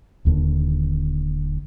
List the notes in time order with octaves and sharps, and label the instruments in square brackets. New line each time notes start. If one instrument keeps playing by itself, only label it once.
[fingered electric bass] D#1 D#2 D3